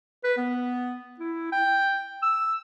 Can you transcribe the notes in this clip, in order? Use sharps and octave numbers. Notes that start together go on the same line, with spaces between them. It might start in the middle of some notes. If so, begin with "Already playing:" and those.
B4
B3
E4
G5
E6